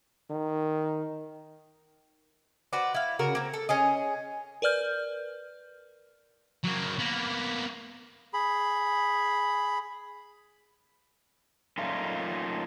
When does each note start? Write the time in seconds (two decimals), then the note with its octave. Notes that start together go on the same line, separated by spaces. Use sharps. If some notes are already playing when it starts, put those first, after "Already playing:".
0.30 D#3
2.73 F#4 B4 C5 D5
2.94 E4 F5
3.19 C#3 F#4 A#4
3.35 A#3 C4
3.54 A4
3.69 C#4 G#4 D#5
4.62 A#4 B4 D5 F6 G6
6.64 F#3 A#3
7.00 A#3 B3
8.34 G#4 B5
11.78 F#2 A#2 A3 D#4 F4